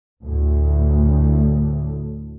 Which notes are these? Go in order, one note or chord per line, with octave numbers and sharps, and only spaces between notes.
D2 A2